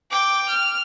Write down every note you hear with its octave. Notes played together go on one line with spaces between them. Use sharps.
G5 D6
F6